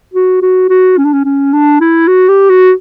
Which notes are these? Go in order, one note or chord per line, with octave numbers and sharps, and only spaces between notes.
F#4
F#4
F#4
C#4
D4
C#4
C#4
D4
E4
F#4
G4
F#4